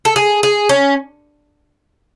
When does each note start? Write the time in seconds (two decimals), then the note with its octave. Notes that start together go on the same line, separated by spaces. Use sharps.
0.05 A4
0.16 G#4
0.43 G#4
0.69 C#4